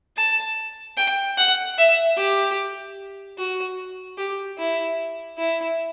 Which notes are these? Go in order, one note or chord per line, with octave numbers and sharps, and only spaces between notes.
A5
G5
F#5
E5
G4
F#4
G4
E4
E4